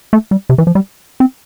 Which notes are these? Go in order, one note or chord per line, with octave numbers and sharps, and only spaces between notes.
A3
G3
C3
E3
F3
G3
C4